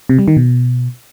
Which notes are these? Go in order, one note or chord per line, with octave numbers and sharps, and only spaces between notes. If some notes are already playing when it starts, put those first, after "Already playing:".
C3
G3
D#3
B2